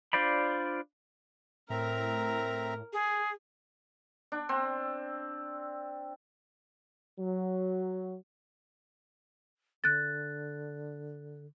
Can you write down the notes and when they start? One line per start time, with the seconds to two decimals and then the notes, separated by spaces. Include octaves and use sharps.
0.13 D4 F4 C5 D5 B5
1.70 A2 C4 A#4 E5 A#5
2.93 G#4
4.32 D4
4.49 C4
7.20 F#3
9.84 D3 F#6 A6